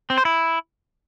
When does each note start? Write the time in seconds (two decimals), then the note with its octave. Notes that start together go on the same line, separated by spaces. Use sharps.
0.10 C4
0.18 C5
0.25 E4